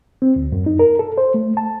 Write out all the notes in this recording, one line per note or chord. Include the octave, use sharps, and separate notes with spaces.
C4
D2
F#2
D#4
A#4
A4
C5
A3
A5